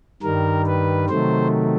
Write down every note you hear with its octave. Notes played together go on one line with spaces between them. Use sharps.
G2 D#3 G3 A#4
B4
C3 D#3 F#3 A3 C5